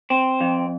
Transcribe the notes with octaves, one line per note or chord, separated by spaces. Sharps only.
C4
F2